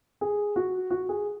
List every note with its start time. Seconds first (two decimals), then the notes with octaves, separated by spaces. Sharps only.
0.21 G#4
0.56 F#4
0.90 F#4
1.09 G#4